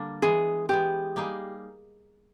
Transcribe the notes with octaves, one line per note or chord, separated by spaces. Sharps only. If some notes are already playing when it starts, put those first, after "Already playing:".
Already playing: D3 G3 A#3 D4
E3 G#3 B3 G#4
E3 G#3 B3 G4
G3 A#3 D#4 G#4